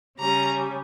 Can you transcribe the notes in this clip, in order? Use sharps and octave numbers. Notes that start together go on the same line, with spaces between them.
C#3 G3 C#4 A#5